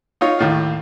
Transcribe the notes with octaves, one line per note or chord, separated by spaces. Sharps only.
D#4 F4 C#5
D#2 A2 F5